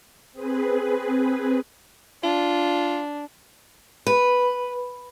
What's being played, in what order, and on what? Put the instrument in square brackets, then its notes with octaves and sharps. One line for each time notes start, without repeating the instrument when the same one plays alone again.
[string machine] C4 G#4 B4
[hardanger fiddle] D4 [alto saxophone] F4
[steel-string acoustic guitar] B4